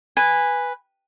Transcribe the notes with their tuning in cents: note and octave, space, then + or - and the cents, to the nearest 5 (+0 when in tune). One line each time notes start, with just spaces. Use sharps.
B4 +0 G#5 -15